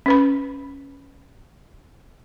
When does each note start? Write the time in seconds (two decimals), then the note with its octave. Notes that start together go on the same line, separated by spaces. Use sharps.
0.06 C#4 B4 B5